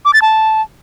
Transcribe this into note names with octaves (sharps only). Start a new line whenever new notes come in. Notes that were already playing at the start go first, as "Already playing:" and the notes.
D6
A6
A5